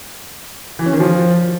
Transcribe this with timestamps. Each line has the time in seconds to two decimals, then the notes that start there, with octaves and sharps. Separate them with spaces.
0.79 E3
0.86 C#4
0.93 D#3
1.00 F3